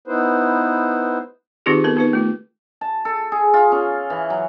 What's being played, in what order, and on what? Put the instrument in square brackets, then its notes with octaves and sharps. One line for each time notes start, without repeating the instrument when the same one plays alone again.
[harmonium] B3 D#4 E4 B4 C5
[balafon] D#3 C4 D#4 F4 G4 G#4
B3 A4 A#4
B3 D#4 B4
A3 F4
[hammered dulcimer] A5
A4
G#4
F4
C#4
E3
F#3